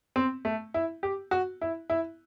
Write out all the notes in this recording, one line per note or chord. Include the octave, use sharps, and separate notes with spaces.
C4
A3
E4
G4
F#4
E4
E4